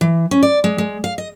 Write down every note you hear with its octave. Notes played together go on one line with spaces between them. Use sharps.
E3
C#4
D5
G#3
G#3
F5
D#5